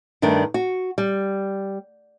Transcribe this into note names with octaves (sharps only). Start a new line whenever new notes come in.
G2 D#3 A3 D4
F#4
G3